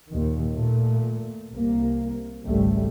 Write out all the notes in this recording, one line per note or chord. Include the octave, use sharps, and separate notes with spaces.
D#2 A#2 D#3
A#2 A3
C2 A#3
G#1 C#2 G3 A3